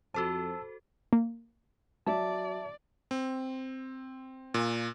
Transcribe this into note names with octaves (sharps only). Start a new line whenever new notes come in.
F2 F#4 A4 C5 A5 E6
A#3
F#3 D5 E5 A5
C4
A#2